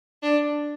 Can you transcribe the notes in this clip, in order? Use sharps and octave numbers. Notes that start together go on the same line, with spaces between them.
D4